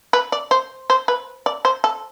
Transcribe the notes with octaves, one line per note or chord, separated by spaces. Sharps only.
B4
D5
C5
C5
B4
D5
C5
A4